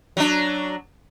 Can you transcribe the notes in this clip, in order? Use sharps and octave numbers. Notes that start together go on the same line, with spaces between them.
F#3 D4